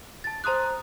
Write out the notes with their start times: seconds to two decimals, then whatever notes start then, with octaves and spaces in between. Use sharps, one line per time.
0.24 A5 A6
0.44 C5 A#5 C6 D#6 F#6